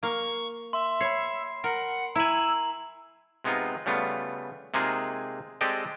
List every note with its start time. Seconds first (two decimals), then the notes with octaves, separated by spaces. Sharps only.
0.03 A#3 F5 C#6
0.73 E5 C6
1.01 C#5 B5 C7
1.64 A#4 F#5
2.16 E4 G#5 A#5 E6 F#7
3.44 C3 G#3 B3 D#4 F4
3.86 C#3 G3 A3 B3 F4
4.74 C3 G#3 A#3 D#4 F4 G#4
5.61 G#3 C4 G4 A4 D5 D#5